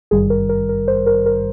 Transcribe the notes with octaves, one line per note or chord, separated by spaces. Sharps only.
G#1 G2 D#3 G3 G#4
A#4
A#4
A#4
C5
A#4
A#4